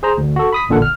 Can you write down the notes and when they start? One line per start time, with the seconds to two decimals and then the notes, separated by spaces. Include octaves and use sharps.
0.03 G#4 C5 A#5
0.18 D2
0.36 F#4 A4
0.53 B5 D#6 B6
0.69 A1 A#2 D3 A4 F#5
0.82 F6